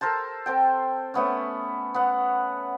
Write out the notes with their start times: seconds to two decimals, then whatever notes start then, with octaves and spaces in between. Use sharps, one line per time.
0.01 A4 A#4 C5 A5
0.46 C4 A4 G5
1.14 A3 B3 C#4
1.94 B3 F#5